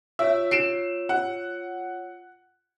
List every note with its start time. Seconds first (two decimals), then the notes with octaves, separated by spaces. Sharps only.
0.19 F4 C#5 E5 E6
0.51 C7 D7 E7
1.09 F#5